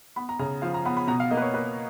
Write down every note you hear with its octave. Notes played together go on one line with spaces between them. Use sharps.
B3 B5
A#5
C#3 A#5
F3 F5
A#5
B3 B5
B5
B2 A#5
F5
A#3 D#5
B4
C#5
A#3 B4